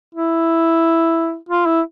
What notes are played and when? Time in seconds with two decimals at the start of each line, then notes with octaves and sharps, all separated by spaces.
0.15 E4
1.49 F4
1.66 E4